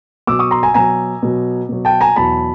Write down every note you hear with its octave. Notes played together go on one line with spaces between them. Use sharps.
B2 F#3 D6 E6
C#6 D#6
A#5 C6
G#5 A#5
B2 F#3 G#5 A#5
B2 F#3
B2 F#3
G5 A5
G#5 A#5
E2 B2 F#3 A5 B5